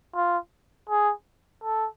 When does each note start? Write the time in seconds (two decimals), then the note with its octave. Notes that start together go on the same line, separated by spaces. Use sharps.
0.15 F4
0.90 G#4
1.64 A4